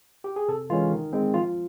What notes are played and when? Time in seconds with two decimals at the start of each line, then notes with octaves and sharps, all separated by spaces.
0.24 G4
0.36 G#4
0.49 C3 A4
0.70 E3 G#3 C#4 F4
0.92 D#3
1.13 G#3 C4
1.34 F3 F4